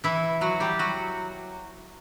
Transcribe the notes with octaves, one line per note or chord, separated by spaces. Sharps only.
E3 E4
F#3 F#4
G3 G4
F#3 F#4